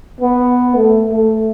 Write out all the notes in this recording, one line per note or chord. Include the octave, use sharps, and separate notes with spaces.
B3
A3
A3